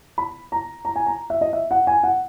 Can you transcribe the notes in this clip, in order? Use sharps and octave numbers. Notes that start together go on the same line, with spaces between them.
B5
A#5
A#5
G#5
A#5
E5
D#5
E5
F#5
G#5
F#5